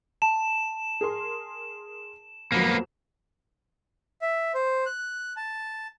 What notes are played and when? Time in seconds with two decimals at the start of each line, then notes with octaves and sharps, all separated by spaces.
0.22 A5 E7
1.01 G#4 A#4 C6
2.52 F2 F#3 A#3 B3
4.22 E5
4.54 C5
4.86 F#6
5.37 A5